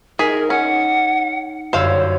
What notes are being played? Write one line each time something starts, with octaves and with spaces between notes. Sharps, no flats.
D#4 G#4 A#4 B6
C#4 F#5
G1 F#2 C5 C#5 F5 E6